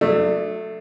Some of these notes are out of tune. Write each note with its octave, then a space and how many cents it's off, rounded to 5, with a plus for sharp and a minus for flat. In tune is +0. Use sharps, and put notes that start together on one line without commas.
F#3 -30 A3 +0 D4 +30